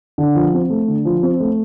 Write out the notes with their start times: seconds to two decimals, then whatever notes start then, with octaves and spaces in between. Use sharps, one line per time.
0.18 D3
0.35 F3
0.54 C4
0.70 A3
0.88 D3
1.05 F3
1.23 C4
1.40 A3